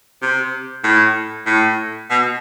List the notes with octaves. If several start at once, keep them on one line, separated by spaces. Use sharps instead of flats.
C3
A2
A2
B2